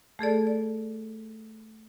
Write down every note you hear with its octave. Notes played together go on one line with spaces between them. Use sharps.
A3 G#4 A4 D5
D5